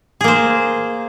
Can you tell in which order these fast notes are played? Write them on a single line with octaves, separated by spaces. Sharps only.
G#4 A#3 C5